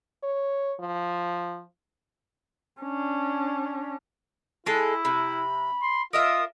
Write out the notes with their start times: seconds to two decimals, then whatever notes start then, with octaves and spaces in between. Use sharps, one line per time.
0.23 C#5
0.80 F3
2.82 C#4 D4
4.66 G#3 E4 G#4 A4
5.05 C3 B5
5.82 C6
6.13 F4 A#4 D#5 E5 D#6